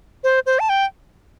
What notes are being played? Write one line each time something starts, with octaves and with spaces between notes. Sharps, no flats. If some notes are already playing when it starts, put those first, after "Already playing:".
C5
C5
A5
G5